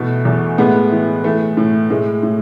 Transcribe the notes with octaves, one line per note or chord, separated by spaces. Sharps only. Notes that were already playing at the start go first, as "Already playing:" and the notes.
Already playing: B2 E3 A3
E2
A2 G#3 B3
E3
E3 A3
A2
A2 G#3
A2